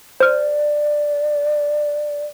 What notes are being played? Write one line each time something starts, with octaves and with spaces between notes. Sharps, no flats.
C5 D5 F6